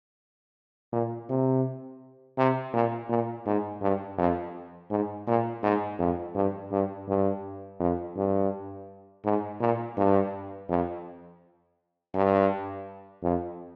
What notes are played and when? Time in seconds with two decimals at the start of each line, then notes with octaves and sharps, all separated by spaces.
0.92 A#2
1.29 C3
2.38 C3
2.73 A#2
3.09 A#2
3.46 G#2
3.82 G2
4.18 F2
4.90 G#2
5.27 A#2
5.63 G#2
5.99 F2
6.35 G2
6.71 G2
7.08 G2
7.80 F2
8.16 G2
9.24 G#2
9.60 A#2
9.97 G2
10.69 F2
12.14 G2
13.23 F2